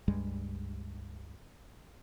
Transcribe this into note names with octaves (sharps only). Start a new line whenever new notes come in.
C#2 G2 G3 G#3